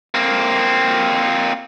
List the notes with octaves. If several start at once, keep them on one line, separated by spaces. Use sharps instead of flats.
A#3 C4